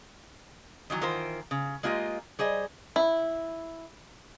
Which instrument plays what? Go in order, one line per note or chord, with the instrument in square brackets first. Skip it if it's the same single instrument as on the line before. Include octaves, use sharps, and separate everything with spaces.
[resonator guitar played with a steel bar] D#3 E3 F#3
D#3 E3 F4 A#4 C5
C#3
G#3 A#3 F4 G4 D#5
G3 G#4 C5 D#5
[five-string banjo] E4